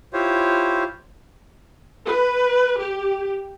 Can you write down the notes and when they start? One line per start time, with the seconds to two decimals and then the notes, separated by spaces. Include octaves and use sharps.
0.13 E4 F4 G4 C5 C#5
2.04 B4
2.78 G4